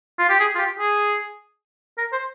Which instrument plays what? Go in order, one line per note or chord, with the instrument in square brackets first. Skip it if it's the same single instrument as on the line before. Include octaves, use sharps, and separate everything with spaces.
[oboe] F4
G4
G#4
F4
G4
G#4
A#4
C5